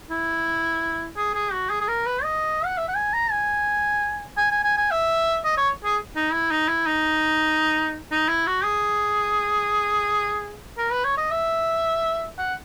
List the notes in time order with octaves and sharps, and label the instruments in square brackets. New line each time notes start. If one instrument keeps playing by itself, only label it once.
[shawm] E4
G#4
G#4
F#4
G#4
G#4
A#4
B4
D#5
F#5
E5
F#5
G#5
A#5
G#5
G#5
G#5
G#5
G#5
E5
D#5
C#5
G#4
D#4
E4
D#4
E4
D#4
D#4
E4
F#4
G#4
A#4
B4
C#5
D#5
E5
F#5